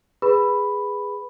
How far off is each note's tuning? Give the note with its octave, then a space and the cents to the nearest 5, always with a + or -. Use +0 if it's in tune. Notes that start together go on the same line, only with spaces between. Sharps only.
G#4 -15 B4 +0 B5 +0